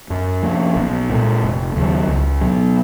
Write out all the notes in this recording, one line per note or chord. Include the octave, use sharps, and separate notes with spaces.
F#2
F3 A#3 C#4
B1
A#2 G#3
F1
D#2 C#3 F#3
C#2
B2 F#3